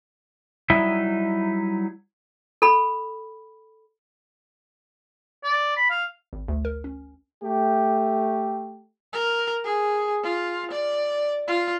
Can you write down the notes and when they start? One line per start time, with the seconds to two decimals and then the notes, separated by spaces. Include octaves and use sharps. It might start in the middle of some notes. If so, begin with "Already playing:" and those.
0.70 F#3 G3 D#4 E4 E5
2.62 A4 B5
5.43 D5
5.76 B5
5.90 F5
6.33 G#1
6.48 D2
6.65 A#4
6.84 C#4
7.42 A3 G4
9.13 A#4
9.65 G#4
10.23 F4
10.71 D5
11.48 F4